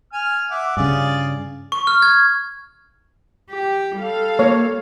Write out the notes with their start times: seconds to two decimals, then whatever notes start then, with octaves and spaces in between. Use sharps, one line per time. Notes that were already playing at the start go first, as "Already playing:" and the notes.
0.13 G#5 F6
0.51 E5 F#5 D6
0.77 G2 C#3 F4 G#4 D5
1.72 C#6
1.87 F6
2.02 G#6
3.50 G4
3.97 G3 A4 F5
4.39 A#3 C#5